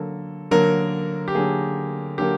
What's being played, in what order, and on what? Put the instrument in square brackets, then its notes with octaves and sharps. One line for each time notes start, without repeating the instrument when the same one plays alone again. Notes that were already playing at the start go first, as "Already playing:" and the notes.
Already playing: [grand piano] D3 F#3 A#3 A4
D3 F#3 A#3 A#4
G4
D3 F#3 A#3 G#4
D3 F#3 A#3 G4